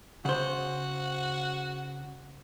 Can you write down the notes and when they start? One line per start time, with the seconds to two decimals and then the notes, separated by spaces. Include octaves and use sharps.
0.25 C#3 F#4 C5